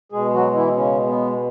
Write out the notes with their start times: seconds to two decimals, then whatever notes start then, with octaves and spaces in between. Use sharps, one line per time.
0.12 B2 G#3 G#4
0.33 F#3 F#4
0.54 E3 E4
0.75 C#3 C#4
1.07 B3